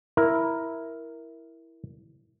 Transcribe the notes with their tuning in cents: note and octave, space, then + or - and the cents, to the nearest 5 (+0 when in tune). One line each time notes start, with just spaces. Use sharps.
E4 +0 A#4 +5